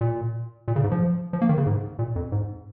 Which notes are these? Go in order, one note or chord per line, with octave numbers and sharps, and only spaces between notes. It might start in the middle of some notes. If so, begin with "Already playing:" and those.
A#2
A#2
C#3
G#2
F3
F3
A#3
D#3
C#3
G#2
A#2
F2
G#2